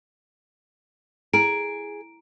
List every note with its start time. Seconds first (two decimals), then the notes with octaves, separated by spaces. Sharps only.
1.33 E4 G#4 A#5 D7